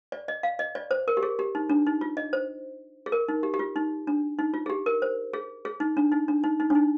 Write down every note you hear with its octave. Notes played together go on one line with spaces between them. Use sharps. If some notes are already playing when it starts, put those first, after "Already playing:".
D5
D#5
F5
D#5
D5
C5
A#4
G4
G#4
G4
D#4
D4
D#4
F4
D#5
C5
G#4
A#4
D#4
G4
G4
F4
D#4
D4
D#4
F4
G#4
G4
A#4
C5
G#4
G#4
D#4
D4
D#4
D4
D#4
D#4
D4
D#4